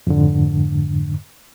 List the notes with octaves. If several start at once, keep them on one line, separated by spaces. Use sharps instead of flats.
F2 G#2 D3